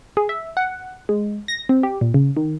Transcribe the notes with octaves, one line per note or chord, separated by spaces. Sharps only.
G#4
E5
F#5
G#3
A#6
C4
G4
A#2
C#3
D#3